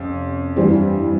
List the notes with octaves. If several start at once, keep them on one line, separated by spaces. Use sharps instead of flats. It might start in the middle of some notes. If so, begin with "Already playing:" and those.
Already playing: F2 C3 C#4
G2 E3 G3 C4